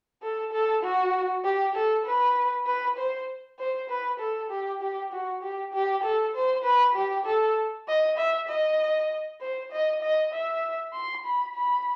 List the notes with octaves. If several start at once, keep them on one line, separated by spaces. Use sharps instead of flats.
A4
A4
F#4
G4
A4
B4
B4
C5
C5
B4
A4
G4
G4
F#4
G4
G4
A4
C5
B4
G4
A4
D#5
E5
D#5
C5
D#5
D#5
E5
C6
B5
B5